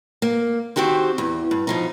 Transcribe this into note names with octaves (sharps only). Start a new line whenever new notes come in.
A#3
D#3 C4 F#4 G4 C5
E2
G2
B2 F3 D#4